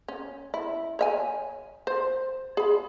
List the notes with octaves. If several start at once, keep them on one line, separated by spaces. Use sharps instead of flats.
C#4
E4
C#5 E5 G#5
C5
G#4 B5